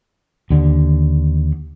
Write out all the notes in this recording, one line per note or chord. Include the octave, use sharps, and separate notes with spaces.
D#2 D3